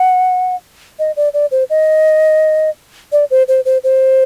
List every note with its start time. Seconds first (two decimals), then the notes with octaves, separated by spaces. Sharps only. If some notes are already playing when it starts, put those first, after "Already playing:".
Already playing: F#5
0.99 D#5
1.16 D5
1.34 D5
1.51 C5
1.70 D#5
3.12 D5
3.31 C5
3.48 C5
3.65 C5
3.84 C5